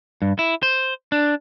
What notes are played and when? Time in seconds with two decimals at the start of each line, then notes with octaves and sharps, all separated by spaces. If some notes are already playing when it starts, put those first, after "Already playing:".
0.22 G2
0.39 E4
0.63 C5
1.12 D4